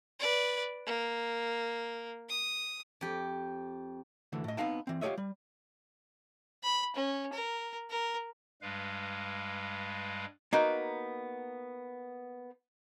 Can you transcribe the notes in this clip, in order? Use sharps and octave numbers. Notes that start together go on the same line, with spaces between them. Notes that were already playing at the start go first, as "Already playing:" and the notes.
B4 D5
A#3
D#6
F2 G4
D2 D3 E3
A2 D#5
B3 C4 D#4 F5 G5 A5
E3 C4
F4 G4 G#4 C#5 D#5 E5
G3
B5
C#4
A#4
A#4
G2 G3 G#3 B4 F5
A#3 B3 D#4 F#4